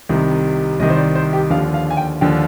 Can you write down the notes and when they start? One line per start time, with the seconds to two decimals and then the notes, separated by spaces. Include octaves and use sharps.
0.09 C2 C3 D#3
0.80 C2 C3 D#3 D#5
0.90 C5
0.97 D5
1.15 C5
1.33 G4
1.50 D#2 D3 F3 F5
1.74 F5
1.90 G#5
1.97 G5
2.21 D#2 D3 F3 G5